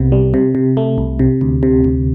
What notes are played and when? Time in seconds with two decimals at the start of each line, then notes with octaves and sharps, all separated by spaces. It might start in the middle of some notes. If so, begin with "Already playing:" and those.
Already playing: C2 C3 B3
0.12 G3
0.34 C3
0.55 C3
0.77 A3
0.98 C2
1.19 C3
1.41 D2
1.63 C3
1.84 D2